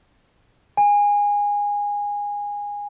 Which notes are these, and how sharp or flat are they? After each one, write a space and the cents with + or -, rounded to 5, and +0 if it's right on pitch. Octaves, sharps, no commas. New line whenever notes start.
G#5 -20